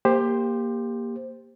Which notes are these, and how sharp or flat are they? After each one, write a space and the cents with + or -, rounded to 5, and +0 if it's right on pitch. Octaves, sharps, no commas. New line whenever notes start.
A#3 +5 G4 +20 C5 +0